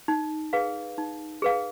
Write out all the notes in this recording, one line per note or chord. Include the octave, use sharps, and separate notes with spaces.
D#4
G#4 B4 F5
D#4
G#4 B4 F5